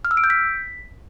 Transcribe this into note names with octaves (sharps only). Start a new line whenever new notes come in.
F6
E6
D7
G6
B6